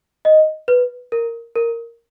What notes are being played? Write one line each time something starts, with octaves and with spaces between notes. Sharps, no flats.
D#5
B4
A#4
A#4